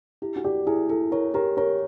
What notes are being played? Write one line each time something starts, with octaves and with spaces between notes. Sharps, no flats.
E4 G4
F#4
G4 D5
E4 G#4
E4 A4
A#4 C#5
G4 A#4
A#4 C#5